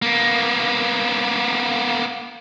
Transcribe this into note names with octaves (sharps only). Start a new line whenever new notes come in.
A#3 B3